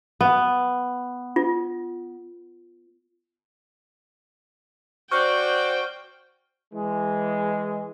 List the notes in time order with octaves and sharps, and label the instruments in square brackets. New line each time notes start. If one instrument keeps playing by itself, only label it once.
[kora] B3
[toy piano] F4
[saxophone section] F#4 D5 [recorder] C5 [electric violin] G5 [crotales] C#6 F6 G6
[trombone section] E3 G#3